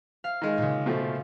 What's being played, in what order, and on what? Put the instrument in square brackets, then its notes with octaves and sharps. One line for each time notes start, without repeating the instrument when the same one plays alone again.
[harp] F5
[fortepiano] D#3 G#3
[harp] A#2 C#3
[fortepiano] B2 F3 A3